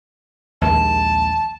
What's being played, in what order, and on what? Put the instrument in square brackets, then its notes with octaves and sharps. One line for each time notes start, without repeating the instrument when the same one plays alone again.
[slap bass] A#1 D#2 G#3 [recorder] A5